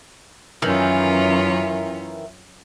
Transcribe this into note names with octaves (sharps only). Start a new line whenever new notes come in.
F#2 D#3 E3 C#4 F4